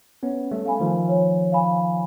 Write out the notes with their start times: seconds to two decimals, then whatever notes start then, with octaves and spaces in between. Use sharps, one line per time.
0.23 B3 C#4 C#5
0.51 G3 A3
0.66 F5 G#5 B5
0.80 D#3 F3
1.09 C#5
1.52 F5 G#5 B5